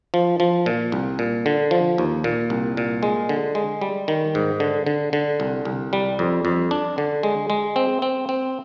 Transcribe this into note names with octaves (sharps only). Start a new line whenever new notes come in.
F3
F3
A#2
C2
A#2
D3
F3
D#2
A#2
C2
A#2
G#3
D3
G#3
G3
D#3
G#2
D3
D3
D3
C2
C2
G3
F2
F2
D4
D3
G#3
G#3
C4
C4
C4